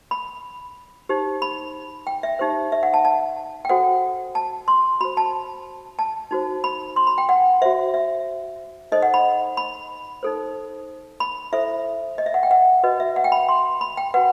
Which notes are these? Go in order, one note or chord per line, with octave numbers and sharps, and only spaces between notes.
B5
D#4 G4 C5
B5
G5
E5
D#4 G4 C5
E5
F#5
A5
A5
G5
F#4 A4 C5 F#5
A5
C6
F#4 C5 B5
A5
A5
D#4 F#4 C5
B5
C6
B5
G5
F#5
F#4 C5 E5
E5
D#4 A4 C5 D#5
F#5
B5
B5
D#4 A4 C5
B5
E4 A4 C5 E5
D#5
E5
F#5
G5
F#5
F#4 B4 D#5
E5
F#5
G5
B5
C6
B5
G5
F#4 B4 F#5